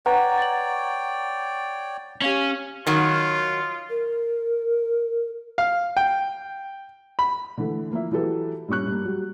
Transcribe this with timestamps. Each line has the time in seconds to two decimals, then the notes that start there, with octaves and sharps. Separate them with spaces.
0.06 B4 C#5 D5 F#5 G5 A#5
0.38 A6 F#7
2.22 C#4 G4 F5 G#6
2.87 D#3 F#3 F4
3.90 A#4
5.58 F5
5.97 G5
7.19 B5
7.58 D3 E3 A3
7.91 F3 A#3 E4 E5
8.11 E3 F#3 E4 G4 A4 B4
8.68 G2 A#2 C#4 C#6 F#6
8.87 G2 A#3
9.05 F#3 G3